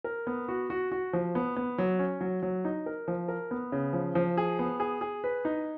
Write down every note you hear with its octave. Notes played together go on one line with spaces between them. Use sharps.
A#4
B3
F#4
F#4
F#4
F3
B3
B3
F#3
C#4
F#3
F#3
D#4
A#4
F3
A#4
B3
C#3
F3
F3
G#4
B3
G#4
G#4
B4
D#4